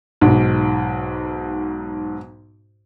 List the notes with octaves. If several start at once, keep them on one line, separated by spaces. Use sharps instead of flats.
B1 G#2